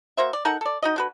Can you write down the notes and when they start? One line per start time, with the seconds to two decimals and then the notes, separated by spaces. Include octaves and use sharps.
0.17 A#3 F#4 C5 E5
0.33 D5
0.45 D#4 A4 A#4 F#5
0.61 A4 D5
0.82 D#4 F#4 D#5
0.96 D3 F#4 B4